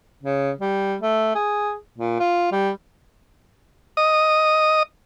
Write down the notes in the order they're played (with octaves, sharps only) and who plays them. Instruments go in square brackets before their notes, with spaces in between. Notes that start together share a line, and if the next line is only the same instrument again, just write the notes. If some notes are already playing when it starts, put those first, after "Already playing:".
[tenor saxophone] C#3
G3
A3
G#4
A#2
F4
G3
[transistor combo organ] D#5 D#6